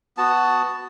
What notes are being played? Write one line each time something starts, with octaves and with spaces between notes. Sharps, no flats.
B3 F#4 A5